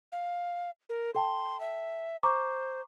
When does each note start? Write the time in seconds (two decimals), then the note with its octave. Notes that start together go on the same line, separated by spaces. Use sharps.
0.12 F5
0.89 A#4
1.15 A4 G5 A5 C6
1.60 E5
2.23 C5 A#5 C#6 D6